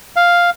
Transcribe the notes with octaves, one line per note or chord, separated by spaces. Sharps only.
F5